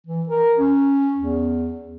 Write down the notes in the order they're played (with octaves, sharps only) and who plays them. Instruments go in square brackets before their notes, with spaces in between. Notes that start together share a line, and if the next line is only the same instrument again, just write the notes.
[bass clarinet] E3
A#4
C#4
E2